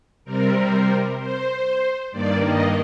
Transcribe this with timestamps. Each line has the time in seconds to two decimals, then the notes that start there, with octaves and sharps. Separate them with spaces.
0.25 C3 G3 C4 A#4
1.18 C5
2.12 G2 D#3 A#3 D5
2.43 D#5